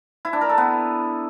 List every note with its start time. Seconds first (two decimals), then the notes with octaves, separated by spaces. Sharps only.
0.25 E4
0.33 D4
0.41 A#4
0.49 A4
0.58 B3